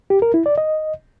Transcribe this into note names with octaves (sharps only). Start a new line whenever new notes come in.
G4
A#4
E4
D5
D#5